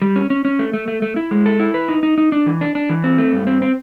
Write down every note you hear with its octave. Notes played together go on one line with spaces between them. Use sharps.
G3
C#4
C#4
C#4
A3
A3
A3
A3
E4
G#3
A4
E4
B4
D#4
D#4
D#4
D4
E3
D4
D4
E3
C4
A3
G2
C4
C4